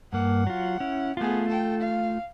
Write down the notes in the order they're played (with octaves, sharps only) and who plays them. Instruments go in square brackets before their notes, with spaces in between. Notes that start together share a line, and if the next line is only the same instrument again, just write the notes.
[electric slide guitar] G2 A#3 [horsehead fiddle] F#5
[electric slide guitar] F#3 F4
C#4 E4
[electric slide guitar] A3 F4 [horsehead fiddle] B3 G#4
[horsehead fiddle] A4 G5
F5